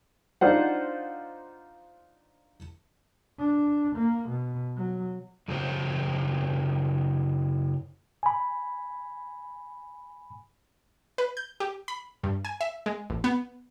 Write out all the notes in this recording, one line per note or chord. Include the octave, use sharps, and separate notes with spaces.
D4 D#4 F4 C5 F#5
D4
A#3
B2
F#3
F#2 C#3 F4 G4 C5 C#5
G#5 B5
B4
G6
G4
B5
G2
G#5
E5
G#3
A1
B3